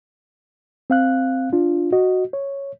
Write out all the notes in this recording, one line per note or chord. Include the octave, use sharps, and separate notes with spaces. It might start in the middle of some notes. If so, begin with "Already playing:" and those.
C4 F5 F#6
D4 F4
F#4 D#5
C#5